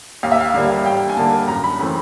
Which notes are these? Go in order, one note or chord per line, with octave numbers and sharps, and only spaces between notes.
D#2 F5
E5
F5
D3 G3 A#3 F5
D#2 G5
G#5
D3 G3 A#3 A5
F#2 A#5
B5
C#3 E3 A3 C4 B5